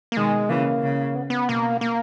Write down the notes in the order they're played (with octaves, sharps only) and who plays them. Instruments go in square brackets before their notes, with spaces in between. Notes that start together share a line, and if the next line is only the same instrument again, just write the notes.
[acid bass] A#3
[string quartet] B2 D#3 [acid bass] G#3
[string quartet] C#3 E3 [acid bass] A#3
[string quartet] C#3
[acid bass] B3
B3
[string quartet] B2 [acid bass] A#3
[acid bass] A#3